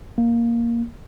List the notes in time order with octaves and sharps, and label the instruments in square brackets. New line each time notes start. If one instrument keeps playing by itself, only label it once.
[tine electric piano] A#3